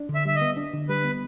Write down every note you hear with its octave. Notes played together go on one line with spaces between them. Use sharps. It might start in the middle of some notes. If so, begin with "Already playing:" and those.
Already playing: D4
D3
E5
G3 E5
D#5
B3
D4
D3
G3 B4
B3